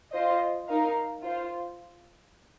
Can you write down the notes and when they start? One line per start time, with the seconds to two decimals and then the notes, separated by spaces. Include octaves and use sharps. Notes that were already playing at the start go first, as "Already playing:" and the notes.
0.12 F4 C5 D#5
0.68 D#4 A#4 F5
1.22 F4 C5